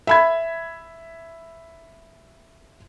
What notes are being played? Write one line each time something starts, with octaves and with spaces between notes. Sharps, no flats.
E5 B5 G#6